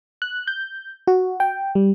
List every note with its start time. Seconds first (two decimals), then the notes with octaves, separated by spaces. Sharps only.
0.22 F#6
0.47 G6
1.07 F#4
1.40 G5
1.75 G3